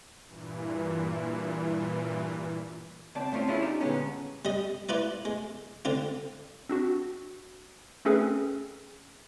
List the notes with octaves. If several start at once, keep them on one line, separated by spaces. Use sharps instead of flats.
G2 A#2 E3
C#2 C4 D5 A5
A2 A3 C4 C#4 F4
C#4 D4 E4 F4 G#4 A4
D#4 G4
A#2 D3 G#3 B3 C#4
G3 D#5
E4 F4 B4 D5
G#3
D3 C4 F4
C4 D4 F#4
A3 C4 C#4 G#4 A4 B4